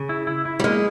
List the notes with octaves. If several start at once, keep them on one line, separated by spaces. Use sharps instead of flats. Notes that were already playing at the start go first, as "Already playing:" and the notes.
Already playing: C#3
E4
E4
E4
G3
G#3 A#3